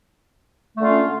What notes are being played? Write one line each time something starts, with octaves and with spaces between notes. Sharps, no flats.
D3 A3 C#4 F4